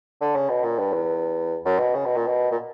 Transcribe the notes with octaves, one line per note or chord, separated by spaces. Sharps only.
D3
C#3
B2
A#2
G2
E2
F#2
B2
C#3
B2
A#2
B2
A#2